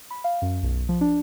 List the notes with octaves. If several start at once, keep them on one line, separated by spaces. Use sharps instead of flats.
B5
F5
F#2
B1
F3
D4